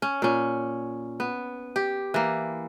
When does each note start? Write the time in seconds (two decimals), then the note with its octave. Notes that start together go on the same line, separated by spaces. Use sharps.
0.02 C#4
0.22 A#2 C#4
1.20 B3
1.76 G4
2.14 E3 A#3